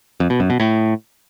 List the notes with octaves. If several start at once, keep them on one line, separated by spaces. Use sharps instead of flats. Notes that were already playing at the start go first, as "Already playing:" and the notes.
F2
B2
F#2
B2
A2